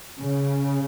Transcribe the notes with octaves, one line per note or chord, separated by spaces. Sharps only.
C#3